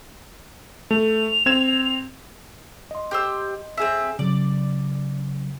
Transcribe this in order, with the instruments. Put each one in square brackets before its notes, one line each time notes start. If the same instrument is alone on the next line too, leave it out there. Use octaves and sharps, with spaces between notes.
[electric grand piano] A3 [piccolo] F7
[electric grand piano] C4 G#6 E7
[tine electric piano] D#5 C6
[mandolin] G4 C5 E6
C4 G#4 E5
[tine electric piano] C#3 F#3 [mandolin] D5